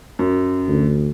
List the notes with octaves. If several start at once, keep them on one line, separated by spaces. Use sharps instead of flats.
F#2
D2